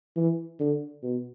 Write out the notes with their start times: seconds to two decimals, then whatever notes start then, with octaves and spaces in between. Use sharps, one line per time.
0.16 E3
0.60 D3
1.03 B2